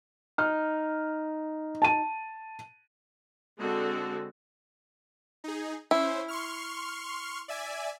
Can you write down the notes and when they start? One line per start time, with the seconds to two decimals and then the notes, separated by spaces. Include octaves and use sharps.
0.38 D#4 F6
1.82 A5 D#7
3.59 D3 G#3 C4 F#4 A4
5.44 D#4 G#4
5.91 C#4 E4 C5
6.28 C6 C#6 F6
7.48 D5 E5 G#5